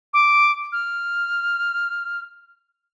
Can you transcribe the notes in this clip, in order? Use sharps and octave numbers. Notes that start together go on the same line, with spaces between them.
D6
F6